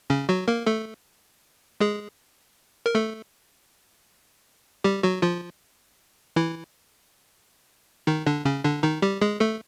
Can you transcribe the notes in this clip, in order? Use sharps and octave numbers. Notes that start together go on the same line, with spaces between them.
C#3 C#4
F#3 F#4
A#3 A#4
A3 A4
G#3 G#4
A#4
A3 A4
G3 G4
F#3 F#4
F3 F4
E3 E4
D#3 D#4
D3 D4
C#3 C#4
D3 D4
D#3 D#4
G3 G4
G#3 G#4
A3 A4